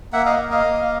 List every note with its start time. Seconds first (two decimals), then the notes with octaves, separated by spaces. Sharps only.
0.13 A#3 E5 F#5
0.26 D#5 F5
0.39 A#3
0.51 D#5 F5
0.65 A#3